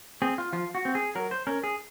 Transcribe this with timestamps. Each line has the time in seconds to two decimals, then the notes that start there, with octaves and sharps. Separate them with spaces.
0.22 C4 G#4
0.38 F4
0.53 F3 F4
0.75 F#4
0.85 C4
0.95 G#4
1.15 F#3 A#4
1.31 C5
1.47 C#4 A#4
1.64 G#4